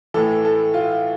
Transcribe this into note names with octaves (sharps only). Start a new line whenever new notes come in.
A2 E3 A4
A4
F4